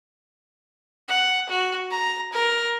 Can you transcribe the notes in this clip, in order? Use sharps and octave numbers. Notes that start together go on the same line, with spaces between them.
F#5
F#4
A#5
A#4